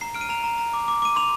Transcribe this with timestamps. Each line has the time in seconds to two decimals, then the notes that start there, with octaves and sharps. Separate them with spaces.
0.01 A#5 C7
0.14 F6 D7
0.21 D#7
0.29 A#5 F7
0.44 A#5
0.58 A#5
0.73 D6
0.88 D6
1.02 D6 D#7
1.16 C6 F7